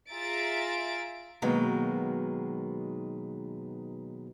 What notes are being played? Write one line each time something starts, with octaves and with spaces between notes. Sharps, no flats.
F4 G#4 E5 A#5 A6 D7
B2 D#3 F#3 G#3 A#3 B3